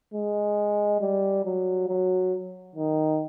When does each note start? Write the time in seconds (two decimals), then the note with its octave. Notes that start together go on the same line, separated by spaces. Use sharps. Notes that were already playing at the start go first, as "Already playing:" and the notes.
0.14 G#3
1.01 G3
1.45 F#3
1.88 F#3
2.76 D#3